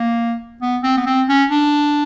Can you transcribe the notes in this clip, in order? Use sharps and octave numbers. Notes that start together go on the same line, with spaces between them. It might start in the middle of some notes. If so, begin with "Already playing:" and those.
Already playing: A#3
B3
C4
B3
C4
C#4
D4